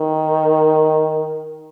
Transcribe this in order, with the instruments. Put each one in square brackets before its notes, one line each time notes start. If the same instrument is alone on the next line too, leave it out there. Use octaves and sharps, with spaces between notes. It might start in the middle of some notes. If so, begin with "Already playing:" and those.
Already playing: [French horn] D#3